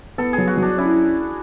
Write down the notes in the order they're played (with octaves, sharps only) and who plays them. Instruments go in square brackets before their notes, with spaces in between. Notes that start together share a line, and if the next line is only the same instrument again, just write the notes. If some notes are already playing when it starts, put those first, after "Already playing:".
[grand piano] B3 [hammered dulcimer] A4
[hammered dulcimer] G#4
[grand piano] F#3
[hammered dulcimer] F#4
[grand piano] F#3
[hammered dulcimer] D4
[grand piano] C#4 [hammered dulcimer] E4